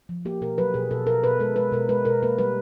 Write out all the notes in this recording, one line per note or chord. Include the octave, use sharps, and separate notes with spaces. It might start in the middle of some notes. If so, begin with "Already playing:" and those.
F3
A#3 G4
B2 A#4
F#3 B4
B2 G#4
B2 A4
B2 A#4
B2 B4
G#3 A4
G#3 B4
B2 A#4
G#3 B4
B2 A#4
A#3 B4
G3 B4